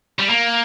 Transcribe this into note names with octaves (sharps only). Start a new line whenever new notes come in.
G3
A#3